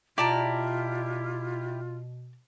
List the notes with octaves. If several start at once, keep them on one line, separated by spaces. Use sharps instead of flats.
B2 E4 F4 G4 D5 A5 A#5